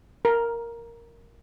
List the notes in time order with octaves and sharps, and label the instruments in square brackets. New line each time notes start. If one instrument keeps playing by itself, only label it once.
[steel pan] A#4